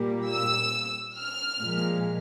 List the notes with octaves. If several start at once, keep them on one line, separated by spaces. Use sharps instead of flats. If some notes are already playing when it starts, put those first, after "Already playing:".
Already playing: A#2 G3 A#3
E6
F6
A#2 F3 G#3